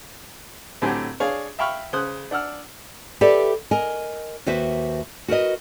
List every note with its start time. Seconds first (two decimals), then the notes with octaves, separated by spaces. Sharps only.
0.82 A2 D3 F#3 C4 G4 G#5
1.20 D4 G#4 C#5 F5
1.59 E5 F5 G5 B5 C#6 F6
1.93 C#3 C5 D#6 F#6
2.31 D4 F#5 E6 F6
3.21 G4 A4 B4 D5 E5
3.71 A#4 D#5 G#5
4.46 D#2 F#4 B4 C5 E5
5.28 F#4 A#4 B4 D#5